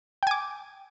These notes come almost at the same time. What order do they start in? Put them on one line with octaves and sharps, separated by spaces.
G5 G#5 D6